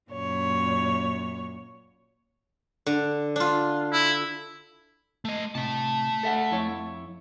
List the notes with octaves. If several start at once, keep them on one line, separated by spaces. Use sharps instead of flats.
F#2 A#2 C#5
D3
D4 F4
E4
A3 D#5
A2 C3 A3 A5
A4 E5 F#5
F2 E4 C#5